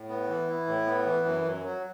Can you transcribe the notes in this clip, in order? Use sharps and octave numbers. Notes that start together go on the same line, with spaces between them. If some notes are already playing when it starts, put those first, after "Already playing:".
Already playing: A2
B3
E3
E4
A2
B3
E3
F#2
F#2
F#3